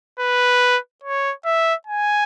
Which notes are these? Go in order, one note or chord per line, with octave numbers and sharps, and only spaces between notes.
B4
C#5
E5
G#5